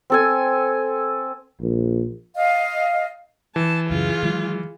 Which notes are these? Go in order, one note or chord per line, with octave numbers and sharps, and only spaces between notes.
C4 A4 G#5
A#1
D#5 F5
E3 A5
C#2 F#2 C#3 F4 G#4
D#3 F#3 G#3